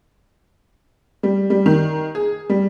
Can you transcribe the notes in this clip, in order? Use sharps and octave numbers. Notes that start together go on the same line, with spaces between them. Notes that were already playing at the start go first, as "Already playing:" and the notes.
G3
G3
D#3
G#4
G3